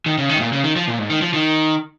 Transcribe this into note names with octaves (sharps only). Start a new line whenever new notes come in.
D#3
C#3
D#3
G#2
A#2
C#3
D#3
F3
A#2
G#2
D#3
F3
D#3